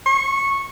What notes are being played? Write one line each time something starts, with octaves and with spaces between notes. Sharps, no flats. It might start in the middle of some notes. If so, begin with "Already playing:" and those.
C#6